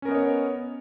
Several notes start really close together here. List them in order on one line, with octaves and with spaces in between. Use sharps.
C#4 A#4 B3 D#5 C#5